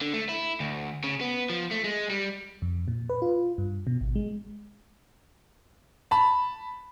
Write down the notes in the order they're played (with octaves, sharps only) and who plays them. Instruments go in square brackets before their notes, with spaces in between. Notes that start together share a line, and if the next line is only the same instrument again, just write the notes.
[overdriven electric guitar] D3
A3
E4
D2
C#3
B3
F3
A3
G#3
G3
[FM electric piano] F2
A#2
B4
F4
G2
B2
G#1
G#3
[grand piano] A5 B5